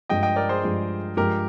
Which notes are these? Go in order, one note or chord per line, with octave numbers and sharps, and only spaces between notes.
G2 F3 G#3 D#5 G5
D#5 G5
A#4 D5
G#4 C5
G2 F3 G#3
G2 F3 G#3 G4 A#4